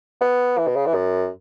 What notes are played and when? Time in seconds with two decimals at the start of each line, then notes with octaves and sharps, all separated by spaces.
0.21 B3
0.58 E3
0.67 B2
0.76 C#3
0.86 E3
0.95 F#2